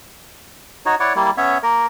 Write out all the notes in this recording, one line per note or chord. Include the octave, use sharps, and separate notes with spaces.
D#4 F#4 C#5
E4 C#5 D5 F#5
G3 A#3 E4
B3 C#4 C#5 E5
A#3 A#4